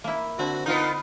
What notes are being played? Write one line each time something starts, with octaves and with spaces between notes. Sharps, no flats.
A#3 E4
D3 C4 F#4
B3 D#4 F4 A#4